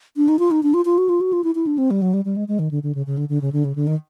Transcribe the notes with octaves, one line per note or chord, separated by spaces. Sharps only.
D4
D#4
F4
D#4
D4
F4
F4
F#4
F4
F#4
F4
E4
E4
D4
C4
G3
F#3
G3
G3
G#3
G#3
D#3
D3
D3
C#3
C#3
D3
D3
C#3
D3
C#3
D3
D#3